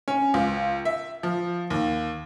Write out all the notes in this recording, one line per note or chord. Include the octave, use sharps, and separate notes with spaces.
C#4
C#2
E5
F3
D#2